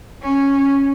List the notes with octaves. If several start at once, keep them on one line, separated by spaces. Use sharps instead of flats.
C#4